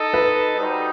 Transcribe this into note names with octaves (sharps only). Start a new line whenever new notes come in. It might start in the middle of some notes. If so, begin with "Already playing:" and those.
Already playing: D#4 A4 D#5
B4
G3 D#4 F#4 C5